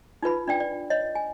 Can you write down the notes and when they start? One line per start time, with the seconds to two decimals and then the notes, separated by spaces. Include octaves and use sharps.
0.23 D#4 F4 B4 B5
0.48 D4 D5 G5
0.60 D5
0.90 C#5 D#5
1.15 G#5